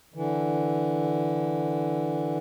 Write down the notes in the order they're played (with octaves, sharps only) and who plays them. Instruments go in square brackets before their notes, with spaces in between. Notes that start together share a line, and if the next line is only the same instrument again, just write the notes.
[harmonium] D3 E3